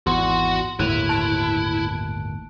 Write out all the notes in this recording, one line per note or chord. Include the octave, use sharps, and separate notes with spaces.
G#1 E2 F#4 F#5 C6
G1 D#2 A2 E4 F#6 D#7 F7
A5 F#6 D7